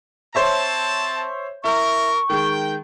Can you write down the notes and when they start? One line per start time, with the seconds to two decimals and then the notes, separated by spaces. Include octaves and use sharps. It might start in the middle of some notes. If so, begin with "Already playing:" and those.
0.35 C4 C5 C#5 E5 A5
1.64 E4 A#4 C#6
2.30 D#3 G#3 G5